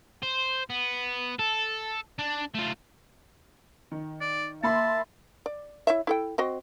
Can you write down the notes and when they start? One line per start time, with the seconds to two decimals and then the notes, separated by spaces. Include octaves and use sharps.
0.23 C5
0.70 B3
1.39 A4
2.19 D4
2.55 A3 F4
3.92 D#3
4.21 D5
4.63 A#3 E5 A5 B5 C6
5.46 D5
5.87 E4 C#5 E5
6.07 E4 A4 G5
6.38 C4 F#4 D#5